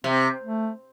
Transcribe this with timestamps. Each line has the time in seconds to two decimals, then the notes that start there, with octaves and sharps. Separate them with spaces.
0.04 C3 C4
0.43 A3